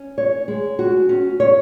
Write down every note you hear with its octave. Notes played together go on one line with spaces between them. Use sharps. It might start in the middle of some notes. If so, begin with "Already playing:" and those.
Already playing: C#4
C#5
G#3
F#4
C#4
C#5